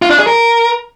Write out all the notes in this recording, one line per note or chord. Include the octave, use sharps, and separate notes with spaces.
F4
D4
G#4
A#4